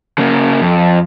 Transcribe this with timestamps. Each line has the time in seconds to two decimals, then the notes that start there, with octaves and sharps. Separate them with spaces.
0.18 C#3 A#3
0.61 F2